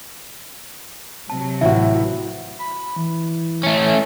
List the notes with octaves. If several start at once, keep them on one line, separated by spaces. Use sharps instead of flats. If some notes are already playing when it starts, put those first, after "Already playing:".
C3 F#3 A5
A1 E4 F#4 E5
B5
E3
A3 C#4